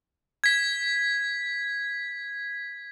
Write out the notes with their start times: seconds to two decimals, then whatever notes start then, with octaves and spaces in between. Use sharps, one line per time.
0.44 G#6 B6